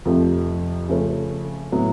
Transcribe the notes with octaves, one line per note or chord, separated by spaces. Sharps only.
F2 C3 F3 A3
C#3 F3 A3 C#4
A2 F#3 B3